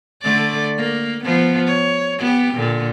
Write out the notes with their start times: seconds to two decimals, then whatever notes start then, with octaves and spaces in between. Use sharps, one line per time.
0.22 D3 A3 D5
0.78 A#3
1.25 F3 B3
1.67 C#5
2.18 B3 G4
2.55 A#2 D3